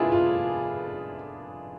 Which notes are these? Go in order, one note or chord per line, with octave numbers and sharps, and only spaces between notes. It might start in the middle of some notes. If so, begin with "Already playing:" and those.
Already playing: F1 F2 D3 B3 D4 E4 F4 G#4
F4